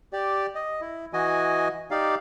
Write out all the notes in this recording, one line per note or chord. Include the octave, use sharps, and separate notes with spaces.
G4 D5
D#5
E4
E3 F#4 D#5 G#5
D#4 G4 D5 F5